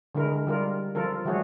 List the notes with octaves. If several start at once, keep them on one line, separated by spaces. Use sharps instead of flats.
D3 G#3 E4 A#4
G3 F4 A#4
F3 F4 A4 A#4
E3 G3 A3 F#4 G#4 C#5